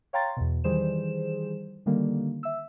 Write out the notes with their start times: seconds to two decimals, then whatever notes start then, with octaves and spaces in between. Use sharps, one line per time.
0.13 C#5 F5 G5 A#5 C6 A6
0.37 E2 B2
0.64 D#3 E3 G3 G#4 C5 E7
1.86 D3 D#3 G3 A#3
2.43 E5 E6